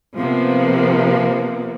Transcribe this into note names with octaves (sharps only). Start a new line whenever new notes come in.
C3 F3 A#3 B3